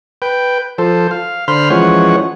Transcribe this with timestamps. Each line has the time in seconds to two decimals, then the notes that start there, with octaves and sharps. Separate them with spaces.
0.22 B4 G5
0.78 F3 A4 C5
1.11 F5
1.48 D3 C5 B5 C6 F6
1.70 E3 F3 G#3 C#4 C#5 F#5